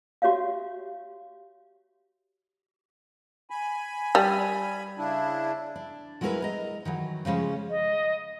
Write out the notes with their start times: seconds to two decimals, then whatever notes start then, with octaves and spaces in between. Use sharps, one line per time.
0.22 F#4 G4 C#5 E5 F5
3.50 G#5 B5
4.15 G3
4.98 C#3 D4 E4
5.76 D4
6.21 F#3 G#3 E4 F4 A#4 B4
6.42 D#5 A#5
6.85 D#3 E3 F#3
7.25 C#3 F3 G#3 C#4
7.69 D#5